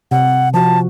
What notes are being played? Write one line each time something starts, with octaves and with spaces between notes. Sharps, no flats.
C3 F#5
F3 F#4 A5